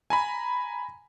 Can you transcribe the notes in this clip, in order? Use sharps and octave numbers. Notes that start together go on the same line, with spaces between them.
G#5 A#5 B5